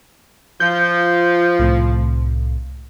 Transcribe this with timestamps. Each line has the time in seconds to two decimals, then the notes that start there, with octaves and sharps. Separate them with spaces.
0.60 F3 G6
1.59 C2 A2